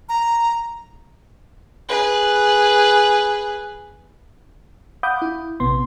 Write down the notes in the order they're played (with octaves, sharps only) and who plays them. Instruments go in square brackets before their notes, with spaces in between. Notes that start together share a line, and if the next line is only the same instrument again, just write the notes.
[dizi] A#5
[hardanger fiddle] G#4 B4
[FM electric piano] F5 F#5 B5 D6 D#6 G6
E4
A#1 C3 B3 C6